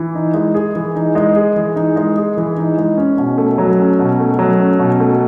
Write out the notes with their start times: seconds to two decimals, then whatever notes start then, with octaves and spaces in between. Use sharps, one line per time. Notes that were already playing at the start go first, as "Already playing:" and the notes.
Already playing: E3
0.15 D#4
0.34 G#3
0.54 G#4
0.75 E3
0.95 D#4
1.15 G#3
1.36 G#4
1.56 E3
1.76 D#4
1.96 G#3
2.17 G#4
2.37 E3
2.58 D#4
2.78 G#3
2.97 C#4
3.18 B2
3.38 A3
3.58 F#3
3.79 C#4
3.99 B2
4.20 A3
4.39 F#3
4.59 C#4
4.79 B2
5.00 A3